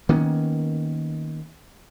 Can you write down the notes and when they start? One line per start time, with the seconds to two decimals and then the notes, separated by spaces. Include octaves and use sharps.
0.09 D#3 A#3 B3 C#4